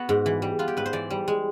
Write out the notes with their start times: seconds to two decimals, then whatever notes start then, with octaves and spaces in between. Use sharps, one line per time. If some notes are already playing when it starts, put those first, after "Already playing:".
Already playing: B3 F#4
0.09 G#2
0.26 E3
0.42 G3
0.59 B3 F4
0.68 G4
0.77 G#2 B4
0.86 C5
0.93 E3 D5
1.10 G3
1.28 G#3